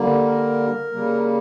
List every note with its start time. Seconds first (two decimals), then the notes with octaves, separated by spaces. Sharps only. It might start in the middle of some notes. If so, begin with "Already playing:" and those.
Already playing: D3 G3 A#3
0.26 A#4
0.92 C#3 G3 A#3